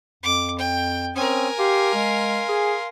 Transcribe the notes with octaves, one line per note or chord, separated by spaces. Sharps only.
F2 D6
G5
C4 C#4 A#4 G#5 D#6
G4 F5 C6
G#3
G#4